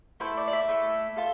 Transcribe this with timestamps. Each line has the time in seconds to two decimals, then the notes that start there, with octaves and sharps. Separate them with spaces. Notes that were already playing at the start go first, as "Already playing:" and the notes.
0.20 A3 E4 A4 C5
0.37 D5
0.47 D5
0.53 E5
0.68 A3 E4 A4
1.16 F4 A4